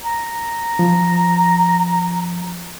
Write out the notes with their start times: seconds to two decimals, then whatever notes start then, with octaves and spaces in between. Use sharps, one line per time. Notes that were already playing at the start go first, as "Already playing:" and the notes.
0.04 A#5
0.79 F3